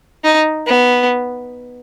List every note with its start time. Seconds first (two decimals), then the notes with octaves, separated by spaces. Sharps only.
0.24 D#4
0.67 B3